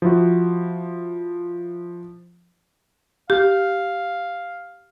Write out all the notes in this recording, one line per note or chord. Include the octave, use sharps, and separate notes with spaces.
F3 E4 F#4
G4 F5